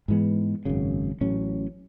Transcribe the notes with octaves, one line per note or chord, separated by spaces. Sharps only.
G#2 E3 G#3 B3
G#1 F#2 C#3
A1 A2 F#3 C#4